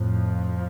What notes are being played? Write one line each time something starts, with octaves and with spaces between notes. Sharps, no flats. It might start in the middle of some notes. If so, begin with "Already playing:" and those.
Already playing: F2 A2 F3